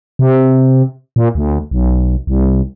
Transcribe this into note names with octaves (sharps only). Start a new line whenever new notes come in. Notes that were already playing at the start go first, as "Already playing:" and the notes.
C3
A#2
D2
B1
C2